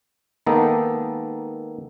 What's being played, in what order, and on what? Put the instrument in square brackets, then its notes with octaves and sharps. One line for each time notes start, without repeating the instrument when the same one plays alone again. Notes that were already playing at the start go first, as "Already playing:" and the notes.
[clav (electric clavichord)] D#3 G#3 A#3 B3 D#4 A4